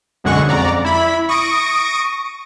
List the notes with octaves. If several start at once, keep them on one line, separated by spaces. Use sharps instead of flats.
B1 F#2 D3 G#3 F#5 C#6
F2 D5 A#5
E4 B5
C#6 D#6 A#6 D7